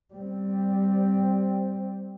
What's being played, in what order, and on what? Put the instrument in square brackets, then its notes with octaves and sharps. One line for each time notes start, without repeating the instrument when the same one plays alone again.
[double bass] G3 C4